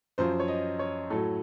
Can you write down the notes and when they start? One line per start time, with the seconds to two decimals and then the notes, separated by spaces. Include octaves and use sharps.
0.18 F#2 F3 C5
0.40 C#5
0.48 D#5
0.79 C#5
1.10 A2 F#3 A4